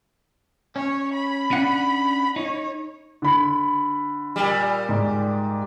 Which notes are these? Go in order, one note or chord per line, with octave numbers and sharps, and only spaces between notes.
C#4 C#5
B5
C#4 D4 F#5
D#4 C#5
D3 B5
A#2 G3
G#2